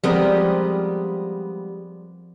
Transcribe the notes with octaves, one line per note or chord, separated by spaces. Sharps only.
F3 G3 G#3 B3 C4 A#4